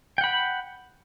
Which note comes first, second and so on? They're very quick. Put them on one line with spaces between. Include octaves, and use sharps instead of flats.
G5 F#5 B5